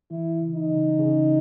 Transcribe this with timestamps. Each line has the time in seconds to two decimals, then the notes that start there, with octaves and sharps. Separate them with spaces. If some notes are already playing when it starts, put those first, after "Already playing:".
0.11 E3 E4
0.41 C#3
0.55 D#4
0.70 C#3
0.99 C#3